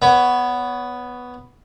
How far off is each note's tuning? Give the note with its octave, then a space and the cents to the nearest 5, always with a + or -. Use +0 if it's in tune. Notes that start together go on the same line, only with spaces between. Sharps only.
B3 +0 C#5 +30